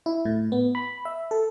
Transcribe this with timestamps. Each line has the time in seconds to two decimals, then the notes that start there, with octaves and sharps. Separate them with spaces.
0.06 E4
0.25 A2
0.52 B3
0.75 B5
1.05 E5
1.31 A4